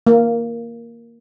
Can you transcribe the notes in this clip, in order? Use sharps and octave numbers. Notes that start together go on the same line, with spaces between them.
A#3